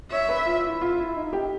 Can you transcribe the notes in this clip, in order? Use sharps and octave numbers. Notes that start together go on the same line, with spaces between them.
C#5 E5
B4
F4
E4
F4
E4
D#4
G4